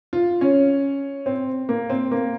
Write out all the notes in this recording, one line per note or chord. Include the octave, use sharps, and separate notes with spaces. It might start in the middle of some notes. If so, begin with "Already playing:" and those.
F4
C#4
C4
A#3
C4
A#3